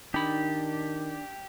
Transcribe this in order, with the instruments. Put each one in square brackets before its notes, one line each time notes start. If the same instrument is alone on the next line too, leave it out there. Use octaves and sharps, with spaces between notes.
[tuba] D#3 [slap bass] D4 [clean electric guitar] D#4 B5 [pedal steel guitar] G4